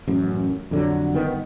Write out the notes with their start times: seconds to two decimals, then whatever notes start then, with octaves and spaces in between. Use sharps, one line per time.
0.08 A1 F#2
0.71 F2 D3 F#3
1.14 G1 D#3 B3